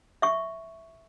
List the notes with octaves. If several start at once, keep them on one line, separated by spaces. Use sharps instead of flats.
E5 C#6